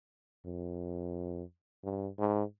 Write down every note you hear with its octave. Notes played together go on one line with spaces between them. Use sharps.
F2
G2
G#2